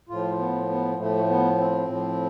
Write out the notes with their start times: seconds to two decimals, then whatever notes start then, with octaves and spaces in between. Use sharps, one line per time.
0.09 A2 F3 F4
0.39 B3
0.69 B3
0.98 A2 F3 A3
1.28 B3
1.58 C4
1.88 A2 F3